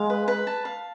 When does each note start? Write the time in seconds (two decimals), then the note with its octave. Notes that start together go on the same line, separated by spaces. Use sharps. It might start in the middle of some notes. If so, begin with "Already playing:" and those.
Already playing: G#3 F5
0.10 B4
0.28 B4
0.47 A5
0.65 F5